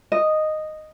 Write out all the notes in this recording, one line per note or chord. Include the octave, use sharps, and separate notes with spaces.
D#5